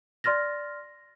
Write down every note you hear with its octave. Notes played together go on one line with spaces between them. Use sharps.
D5 C6 F6 A6 A#6